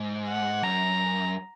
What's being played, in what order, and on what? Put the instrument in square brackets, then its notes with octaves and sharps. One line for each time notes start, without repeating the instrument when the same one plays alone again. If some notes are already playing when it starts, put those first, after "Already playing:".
Already playing: [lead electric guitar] G#2
[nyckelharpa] F#5
[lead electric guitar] F#2 [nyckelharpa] A#5